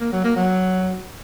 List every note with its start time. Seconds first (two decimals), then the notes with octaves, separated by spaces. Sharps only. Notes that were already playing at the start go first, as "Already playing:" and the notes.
0.01 A#3
0.12 F#3
0.24 A#3
0.36 F#3